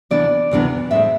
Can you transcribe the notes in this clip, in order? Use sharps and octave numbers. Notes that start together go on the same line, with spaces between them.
D2 C3 E3 B3 D4 D5
D2 C3 E3 B3 D4
A2 G#3 C4 E5